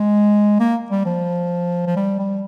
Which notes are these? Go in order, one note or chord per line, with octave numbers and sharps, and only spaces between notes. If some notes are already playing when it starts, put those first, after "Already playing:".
Already playing: G#3
A#3
G3
F3
F3
G3
G3